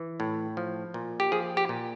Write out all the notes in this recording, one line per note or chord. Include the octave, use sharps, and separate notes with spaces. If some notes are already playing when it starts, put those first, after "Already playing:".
Already playing: E3
A2
F3
A#2
G4
F3 G#4
G4
A#2